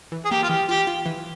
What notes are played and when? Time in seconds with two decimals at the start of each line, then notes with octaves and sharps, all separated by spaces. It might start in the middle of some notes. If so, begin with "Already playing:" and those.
0.12 E3
0.25 G#4
0.31 A#3 G4
0.43 F4
0.49 E3 G4
0.68 F4 G4
0.87 F4
1.06 E3